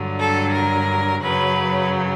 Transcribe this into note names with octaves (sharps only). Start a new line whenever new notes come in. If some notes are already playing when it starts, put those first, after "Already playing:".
Already playing: G2 D3 F#3
A4
A#4
F#2 C#3 F#3 B4